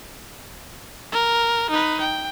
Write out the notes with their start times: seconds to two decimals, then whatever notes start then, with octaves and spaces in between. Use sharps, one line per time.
1.12 A#4
1.70 D#4 B4
2.00 G5